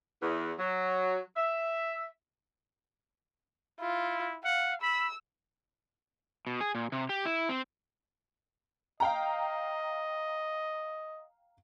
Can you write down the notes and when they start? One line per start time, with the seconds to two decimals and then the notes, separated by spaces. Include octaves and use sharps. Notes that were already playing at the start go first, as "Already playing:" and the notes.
0.21 E2
0.59 F#3
1.36 E5
3.80 E4 F4
4.44 F5 F#5
4.82 B5 E6
6.47 B2
6.61 G#4
6.75 A#2
6.92 C3
7.09 G4
7.25 E4
7.49 C4
9.00 D#5 F5 G5 A#5